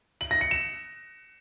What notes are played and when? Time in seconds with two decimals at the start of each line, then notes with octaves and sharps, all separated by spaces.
0.21 F#7
0.31 A#6
0.41 C#7
0.51 E7